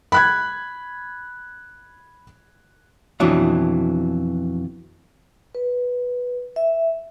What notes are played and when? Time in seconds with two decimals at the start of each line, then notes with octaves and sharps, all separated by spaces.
0.12 B5 F#6 G#6
3.20 F2 B2 E3 F#3 D4
5.55 B4
6.56 E5